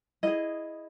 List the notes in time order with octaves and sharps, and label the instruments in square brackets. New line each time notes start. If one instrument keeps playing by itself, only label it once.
[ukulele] E4 G#4 D#5